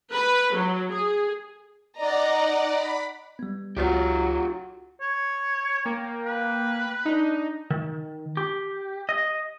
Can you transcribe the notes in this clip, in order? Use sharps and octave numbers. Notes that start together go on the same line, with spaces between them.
B4
F#3
G#4
D#4 D5 D#5 F#5 A#5
B5
G3 B3
C#2 F#3 F4 G4 D#6
C#5
A#3 G5
B4
D4 D#4
D#3
G4
D#5